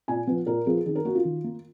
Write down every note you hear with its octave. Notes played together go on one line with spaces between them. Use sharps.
A#2 G#5
F3 B3
A#2 A#4
F3 B3 G#4
D#3 G#4
A#4
A#3 F#4
F4
D#3
A#3